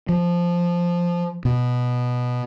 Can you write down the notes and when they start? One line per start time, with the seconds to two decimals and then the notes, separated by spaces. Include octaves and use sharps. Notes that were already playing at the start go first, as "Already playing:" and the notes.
0.09 F3
1.45 B2